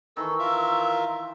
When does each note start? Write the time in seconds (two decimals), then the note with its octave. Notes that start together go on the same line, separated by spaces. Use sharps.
0.17 D#3 E3 A4 C#6 E6
0.39 F4 A#4 E5